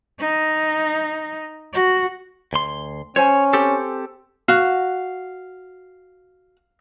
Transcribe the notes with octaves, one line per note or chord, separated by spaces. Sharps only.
D#4
F#4
D2 C6
C#4 C5 C#5 G#5
C4 G4 A4
F#4 F5